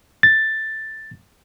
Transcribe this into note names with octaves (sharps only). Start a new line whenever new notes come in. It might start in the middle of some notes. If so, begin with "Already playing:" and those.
A6